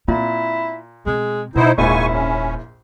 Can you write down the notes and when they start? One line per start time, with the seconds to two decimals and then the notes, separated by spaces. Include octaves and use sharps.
0.08 A#2 C4 E4
1.06 B2 G#3 C4
1.56 B2 B3 D#4 E4 C5
1.78 D#1 A#1 F2 G#2 E4 G#5 C#6
2.10 C#4